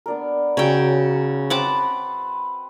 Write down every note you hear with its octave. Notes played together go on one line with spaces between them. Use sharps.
B3 D4 A#4
C#3 F#3 C#4 C#5 G5
C4 B4 F#5 A5 B5 D6